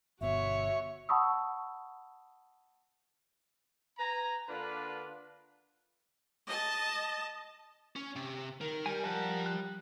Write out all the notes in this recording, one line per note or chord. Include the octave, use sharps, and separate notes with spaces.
G1 B2 F#4 C#5 E5
F#5 A5 B5 C#6 D#6 E6
B4 G#5 A#5
D3 A#3 D4 F4 B4
D#5 A5
C#4
C3
D#3 A#4
G3 G#5
F3 A#4 F#5 A5
F#6